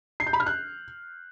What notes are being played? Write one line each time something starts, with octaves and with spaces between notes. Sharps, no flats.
C7
G6
B5
F6
F#6